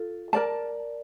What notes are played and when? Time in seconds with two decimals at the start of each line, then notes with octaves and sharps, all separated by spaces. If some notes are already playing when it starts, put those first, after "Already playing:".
Already playing: F4 A4
0.33 A#4 D5 A5